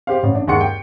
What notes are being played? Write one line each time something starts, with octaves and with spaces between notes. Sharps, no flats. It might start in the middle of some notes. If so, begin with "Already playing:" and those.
G4 C5 F5
A1
D4
G1 D#2 G#3 F#5 C6 C#7
G5